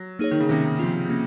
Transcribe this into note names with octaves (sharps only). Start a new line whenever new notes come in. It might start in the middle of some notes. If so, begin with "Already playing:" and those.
Already playing: F#3
A#3 D#4 G#4 C#5
D#3
C#3
C3 D#3 A#3 C#4
F3 C4 F4
A#3 C#4